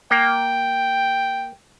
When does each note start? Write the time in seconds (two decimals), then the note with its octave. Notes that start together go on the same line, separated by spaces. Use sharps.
0.11 A#3 G5